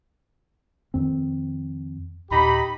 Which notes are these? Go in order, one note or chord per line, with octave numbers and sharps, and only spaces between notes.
F2 D#3 C4
D#2 A#2 D#4 G4 B5